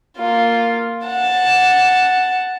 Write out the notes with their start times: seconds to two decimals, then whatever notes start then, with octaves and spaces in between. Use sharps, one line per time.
0.18 A#3 F4
1.05 F#5 A5